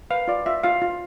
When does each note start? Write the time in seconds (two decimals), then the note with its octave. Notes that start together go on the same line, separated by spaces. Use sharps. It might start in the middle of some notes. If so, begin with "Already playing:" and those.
0.10 B4 F5
0.28 F4 D5
0.46 F4 E5
0.64 F4 F5
0.82 F4